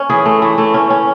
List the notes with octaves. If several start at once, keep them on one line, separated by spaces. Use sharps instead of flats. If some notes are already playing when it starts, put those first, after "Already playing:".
Already playing: C#4
E3 G#4
A3
E3
A3
C#4
C#4